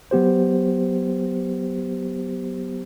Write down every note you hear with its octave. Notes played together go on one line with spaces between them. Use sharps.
F#3 B3 G4 C5